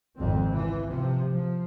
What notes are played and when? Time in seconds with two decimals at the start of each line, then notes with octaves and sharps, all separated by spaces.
0.19 G#1 F2 B2 C4
0.51 C#2 E3
0.88 C3 F3
1.32 F3